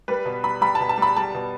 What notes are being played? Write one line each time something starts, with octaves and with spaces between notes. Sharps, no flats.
G3 B4
B2
G3 B5
G3 B5
A5
B2
A5
G3 B5
G3 A5
B2